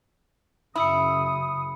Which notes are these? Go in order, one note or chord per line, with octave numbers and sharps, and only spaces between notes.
F#2 C#3 E4 B5 D#6 E6 C#7